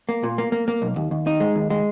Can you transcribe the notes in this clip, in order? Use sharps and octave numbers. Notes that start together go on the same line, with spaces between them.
A#3
A#2
A#3
A#3
A#3
B1
D#2
D#2
D#4
G#3
D#2
G#3